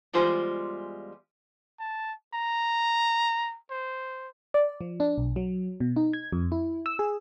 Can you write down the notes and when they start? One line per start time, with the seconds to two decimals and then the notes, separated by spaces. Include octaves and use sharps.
0.13 E2 G3 G#3 F4 C5 G#5
1.80 A5
2.34 A#5
3.71 C5
4.54 D5
4.81 F3
5.00 D4
5.18 B1
5.36 F#3
5.80 B2
5.96 D#4
6.13 G#6
6.32 F2
6.52 E4
6.86 E6
6.99 G#4